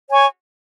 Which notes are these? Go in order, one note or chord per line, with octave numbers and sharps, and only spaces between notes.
C#5 G#5 C#6